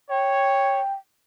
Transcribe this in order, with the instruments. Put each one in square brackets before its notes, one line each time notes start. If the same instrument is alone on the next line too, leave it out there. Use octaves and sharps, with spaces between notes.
[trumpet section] C#5 [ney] G5